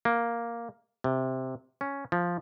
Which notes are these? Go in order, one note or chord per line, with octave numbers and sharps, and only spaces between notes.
A#3
C3
C#4
F3